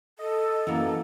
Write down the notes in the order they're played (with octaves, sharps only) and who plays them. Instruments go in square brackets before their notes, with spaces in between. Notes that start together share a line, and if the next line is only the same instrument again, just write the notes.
[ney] A4 [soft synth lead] D#5
[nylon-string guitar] F#2 A#3 [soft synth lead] E3